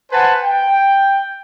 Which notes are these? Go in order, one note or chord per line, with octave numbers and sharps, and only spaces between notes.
B4 C5 F#5 G#5 A5
G5